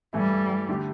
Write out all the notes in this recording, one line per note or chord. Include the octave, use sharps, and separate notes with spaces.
G2 E3 G3 A3 E4
D3 A3 G4